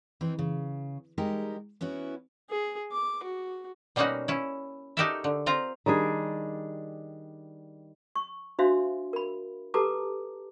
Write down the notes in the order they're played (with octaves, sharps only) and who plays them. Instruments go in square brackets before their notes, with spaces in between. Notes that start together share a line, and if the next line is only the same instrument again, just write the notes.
[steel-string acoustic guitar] E3 C4 D#4
C#3
G3 G#3 D#4 G4 A#4
B3 C#4 E4 F#4
[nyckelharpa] G#4
D6
F#4
[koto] B2 G3 A#3 C#4 D#4 F#4
C#4 E4
D#4 F#4 G4 A4 A#4 E5
D3
C4 F4 A#5
[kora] D#3 G3 D4 G#4
[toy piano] C#6
D4 F#4 C5 E5 F5 C6
A#4 B5
G4 A4 B4 A5 A#5 D6